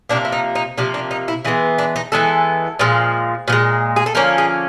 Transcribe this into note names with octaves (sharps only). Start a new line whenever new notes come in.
C3 F3 A#3 D4
E4
D#4
D#4
C3 F3 A#3 D4
D4
D#4
E4
E3 G#3 B3 E4
D4
D#4
E3 G#3 B3 A4
A#2 F3 G#3
A#2 F3 G#3
G#4
A4
D3 F3 A#3 C#4 A#4
G#4